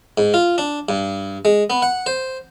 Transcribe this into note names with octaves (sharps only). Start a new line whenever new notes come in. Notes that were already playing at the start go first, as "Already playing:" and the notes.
G#2
F4
D4
G2
G#3
B3
F#5
C5